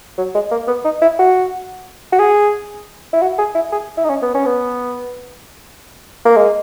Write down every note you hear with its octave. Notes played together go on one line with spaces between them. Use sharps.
F#3
G#3
A#3
B3
D#4
E4
F#4
F#4
G#4
E4
F#4
G#4
E4
G#4
E4
D#4
C#4
B3
C#4
B3
A#3
G#3